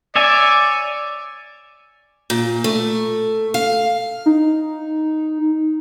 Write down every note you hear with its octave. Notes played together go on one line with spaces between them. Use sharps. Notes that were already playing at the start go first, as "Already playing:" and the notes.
C#5 D5 E5 G#5
A#2
A3
F5
D#4